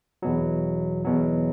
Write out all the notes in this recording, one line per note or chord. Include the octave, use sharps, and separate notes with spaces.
E2 B2 F#3
E2 B2 F#3